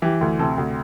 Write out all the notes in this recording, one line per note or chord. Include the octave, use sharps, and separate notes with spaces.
E3 G4
D2
C3 A4
D2